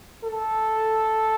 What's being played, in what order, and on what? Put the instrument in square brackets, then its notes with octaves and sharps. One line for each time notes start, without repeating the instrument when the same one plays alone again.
[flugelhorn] A4